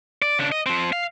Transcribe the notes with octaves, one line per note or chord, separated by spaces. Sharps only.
D5
C#3 D4
D#5
F3 C4
F5